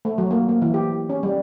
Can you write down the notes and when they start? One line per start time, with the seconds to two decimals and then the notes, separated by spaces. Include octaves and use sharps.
0.05 A3
0.18 F#3
0.31 A#3
0.49 A#3
0.62 E3
0.74 G4
1.09 C#4
1.23 G3